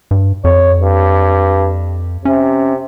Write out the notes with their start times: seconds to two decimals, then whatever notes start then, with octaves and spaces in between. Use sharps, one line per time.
0.11 G2
0.44 F2 C#5
0.81 G2
2.25 C3 C#4